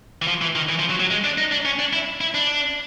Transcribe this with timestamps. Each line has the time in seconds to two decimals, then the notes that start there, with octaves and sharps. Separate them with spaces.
0.22 E3
0.27 F3
0.42 E3
0.56 D#3
0.69 E3
0.79 F3
0.90 F#3
1.00 F#3
1.11 G#3
1.24 D4
1.38 D#4
1.52 D4
1.65 C#4
1.79 D4
1.93 E4
2.21 E4
2.34 D4